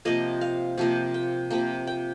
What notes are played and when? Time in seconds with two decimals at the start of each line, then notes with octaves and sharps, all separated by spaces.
0.05 C3 F3 A#3 D#5
0.41 F5
0.78 C3 F3 A#3
1.14 G5
1.50 C3 F3 A#3 G5
1.87 G5